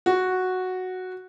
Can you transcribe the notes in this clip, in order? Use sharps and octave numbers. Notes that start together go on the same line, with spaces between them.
F#4